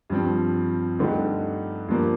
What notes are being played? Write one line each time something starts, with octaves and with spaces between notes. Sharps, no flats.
G2 F3 C4
G2 D3 A3 D#4 G4
G2 F3 A#3